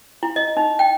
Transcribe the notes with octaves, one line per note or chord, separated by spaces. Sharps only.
E4
D#5
D#4
G5